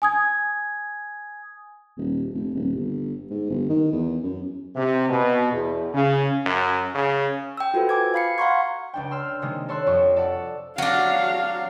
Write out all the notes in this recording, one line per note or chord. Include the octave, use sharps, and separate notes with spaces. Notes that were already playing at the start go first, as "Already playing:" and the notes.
G#5 D#6 G#6
D#1
F1
D#1
G1
G#2
G1
D#3
E2
F#2
C3
B2
E2
C#3
F#2
C#3
G5 E6
F4 F#4 A4 B4 C5
G#5 D6 G#6
F5 B5 C7 C#7
F5 F#5 A#5 C6 C#6 G#6
C#2 D4 G5
C6 E6 F6
C3 D#3 G3 G#3 A#3
A4 C#5 C6 E6 F#6
F2 F#4 D5 C#6
A4 D5 F#5
F#3 D4 F#4 F5